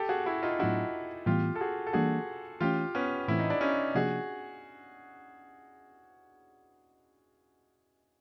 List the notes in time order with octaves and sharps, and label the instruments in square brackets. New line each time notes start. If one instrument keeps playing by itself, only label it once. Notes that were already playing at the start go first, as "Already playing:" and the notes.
Already playing: [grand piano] G4 A4
F#4 G#4
E4 F#4
D#4 F4
[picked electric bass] A2 F#3 B3 D4 [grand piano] E4 F#4
[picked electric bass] A2 E3 G3 B3 [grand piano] F4 G4
[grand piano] A4
F#4 G#4
A4
[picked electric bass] E3 G3 A#3 D4 [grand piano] F#4 G#4
[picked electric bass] E3 A3 C#4 [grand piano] F4 G4
[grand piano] B3 C#4
[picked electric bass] A2 E3 A3 C4 [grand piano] E4
[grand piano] D#4
D4
C#4 D#4
[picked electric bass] C3 F3 A#3 D4 [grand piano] F#4 G#4